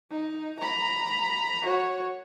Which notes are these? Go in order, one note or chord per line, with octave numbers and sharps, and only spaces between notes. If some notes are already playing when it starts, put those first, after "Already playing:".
D#4
A#5 B5
F#4 C#5